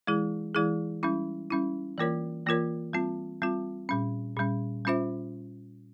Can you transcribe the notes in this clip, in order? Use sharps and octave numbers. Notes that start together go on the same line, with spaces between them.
E3 G#3 E4 G#4
E3 G#3 E4 G#4
G3 C#4 E4
G3 C#4 E4
E3 A#3 F4 A#4 C#5
E3 A#3 F4 A#4 C#5
G3 C4 F4
G3 C4 F4
A#2 G3 C#4
A#2 G3 C#4
G3 C#4 F4 C5 E5